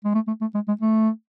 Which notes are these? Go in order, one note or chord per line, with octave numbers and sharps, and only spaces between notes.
G#3
A3
A3
A3
G#3
G#3
A3